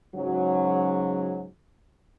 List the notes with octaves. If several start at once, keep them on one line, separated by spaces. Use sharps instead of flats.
G#2 C#3 F#3